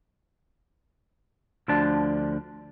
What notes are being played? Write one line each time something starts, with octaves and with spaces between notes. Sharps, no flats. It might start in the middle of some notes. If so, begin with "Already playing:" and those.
D2 D3 F3 D4 A5